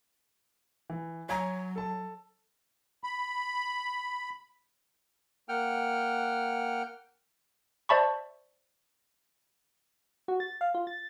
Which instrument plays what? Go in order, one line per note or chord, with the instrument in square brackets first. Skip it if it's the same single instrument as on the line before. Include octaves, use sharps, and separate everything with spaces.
[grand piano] E3
[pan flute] F#3 [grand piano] C#5 G#5 A#5
[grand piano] A4 A5
[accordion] B5
[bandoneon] A#3 F#5 G5 F6
[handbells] C5 D5 E5 A5 B5 C#6
[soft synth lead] F#4
A6
F5
F4
A6